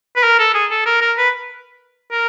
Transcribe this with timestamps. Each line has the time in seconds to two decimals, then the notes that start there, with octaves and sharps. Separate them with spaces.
0.17 B4
0.23 A#4
0.39 A4
0.55 G#4
0.71 A4
0.86 A#4
1.01 A#4
1.18 B4
2.12 A#4